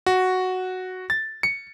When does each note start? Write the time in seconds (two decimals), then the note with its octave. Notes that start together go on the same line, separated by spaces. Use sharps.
0.06 F#4
1.10 A6
1.43 C#7